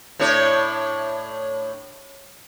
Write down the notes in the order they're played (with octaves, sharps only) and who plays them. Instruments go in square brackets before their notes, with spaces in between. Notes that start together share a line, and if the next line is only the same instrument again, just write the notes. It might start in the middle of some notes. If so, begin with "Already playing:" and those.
[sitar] A2 D4 C#5